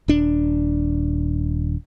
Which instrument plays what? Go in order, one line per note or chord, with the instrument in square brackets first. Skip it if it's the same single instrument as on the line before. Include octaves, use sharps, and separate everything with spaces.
[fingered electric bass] D#1 D4